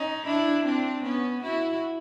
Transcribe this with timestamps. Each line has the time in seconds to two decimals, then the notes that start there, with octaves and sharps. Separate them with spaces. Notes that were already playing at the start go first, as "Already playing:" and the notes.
Already playing: C#4 D#4
0.26 D4 E4
0.65 C4 D4
1.04 B3 C#4
1.42 E4 F#4